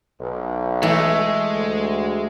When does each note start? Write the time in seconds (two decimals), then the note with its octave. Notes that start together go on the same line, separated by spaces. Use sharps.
0.19 B1
0.83 E3 G#3 A3
1.54 D2